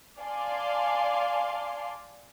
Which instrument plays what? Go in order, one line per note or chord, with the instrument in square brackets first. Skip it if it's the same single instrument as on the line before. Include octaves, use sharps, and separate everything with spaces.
[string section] D5 F5 G#5 A5 C6